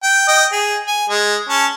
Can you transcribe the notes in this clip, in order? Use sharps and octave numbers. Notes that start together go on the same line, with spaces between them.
G5
D#5 G5
G#4
G#5
G#3
C#4 A5